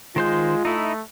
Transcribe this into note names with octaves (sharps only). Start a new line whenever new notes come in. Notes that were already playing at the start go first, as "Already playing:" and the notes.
D#3 G#3 F4 C5 G6
A3 D#4 E4